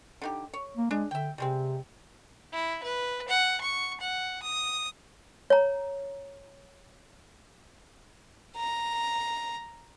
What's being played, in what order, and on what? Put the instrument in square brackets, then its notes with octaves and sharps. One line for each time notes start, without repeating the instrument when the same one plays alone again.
[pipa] D3 D#4 G4
C#5
[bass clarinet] A#3
[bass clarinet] G#3 [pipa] D4 G#4
[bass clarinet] D3 [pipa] E5 G5
[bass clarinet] C3 [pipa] G3 G#3 C4
[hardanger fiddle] E4
B4
F#5
C#6
F#5
D#6
[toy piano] C#5 A#5
[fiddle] A#5